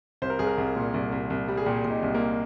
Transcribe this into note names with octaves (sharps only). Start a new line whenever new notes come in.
C2 C5
A#4
C2 G#4
A#4
C2
A#2
C2
C2
C2
G3
G#4
A#2 G4
A#2
D#4
C2
A#3